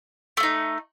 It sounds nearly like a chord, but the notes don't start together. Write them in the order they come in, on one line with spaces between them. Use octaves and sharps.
A3 F4 D#4